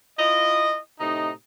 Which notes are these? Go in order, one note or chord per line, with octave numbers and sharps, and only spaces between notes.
E4 F4 D#5
A2 C3 D#4